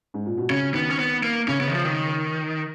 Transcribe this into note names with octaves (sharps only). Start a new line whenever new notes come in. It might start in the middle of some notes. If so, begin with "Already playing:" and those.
G#2
A#2
B2
C#3 C#4
D#3 B3
C#4
B3
A#3
C#3 C#4
B3
D#3
F3
D#3